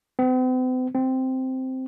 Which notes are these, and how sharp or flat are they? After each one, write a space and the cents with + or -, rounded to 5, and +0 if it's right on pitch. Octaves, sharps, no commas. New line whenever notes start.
C4 -45
C4 -5